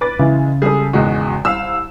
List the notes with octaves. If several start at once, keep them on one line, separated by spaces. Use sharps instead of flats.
B4 D6 A6
C#3 E3 G#3 E4
G3 G#3 G#4 A4 D#6
G#1 E2 G#3 F#4
C2 F5 E6